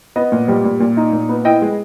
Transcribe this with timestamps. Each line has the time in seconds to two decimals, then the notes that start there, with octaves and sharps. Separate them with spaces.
0.16 B3 D#5
0.32 A#2
0.48 G3
0.64 A#2
0.80 A#2
0.97 D#4
1.13 A#2
1.29 B3
1.45 E4 D#5 G5
1.62 G#3